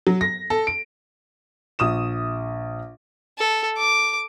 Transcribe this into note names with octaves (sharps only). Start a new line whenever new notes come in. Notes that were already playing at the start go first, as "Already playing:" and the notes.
F#3
A#6
A4
D7
A#1 D#6 E7
A4
D6